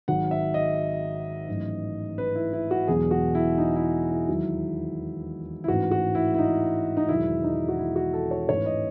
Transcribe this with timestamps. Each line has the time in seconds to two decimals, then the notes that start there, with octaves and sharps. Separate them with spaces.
0.08 G#1 G#2 D#3 F#3 F#5
0.31 E5
0.54 D#5
1.48 A1 G#2 F#3
2.18 B4
2.35 E4
2.53 E4
2.71 F#4
2.88 E1 E2 B2 F#3 G#4
3.11 F#4
3.35 E4
3.58 D#4
3.76 E4
4.11 E4
4.28 E1 D#2 D#3 F#3
5.64 E4
5.68 A1 G#2 E3 F#4
5.91 F#4
6.15 E4
6.34 E4
6.38 D#4
6.97 D#4
7.09 E1 E2 D#3 F#3 E4
7.44 D#4
7.69 F#4
7.79 E4
7.96 F#4
8.13 A4
8.31 C#5
8.49 A1 G#2 E3 C#5
8.66 D#5